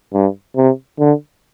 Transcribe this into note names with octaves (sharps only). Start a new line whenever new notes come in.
G2
C3
D3